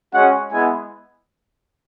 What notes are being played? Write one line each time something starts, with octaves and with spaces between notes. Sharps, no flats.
G#3 C#4 F#4 F#5
G#3 B3 E4 G#5